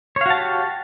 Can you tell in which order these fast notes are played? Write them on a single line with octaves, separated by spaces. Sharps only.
C#5 F5 F#4 A5 G4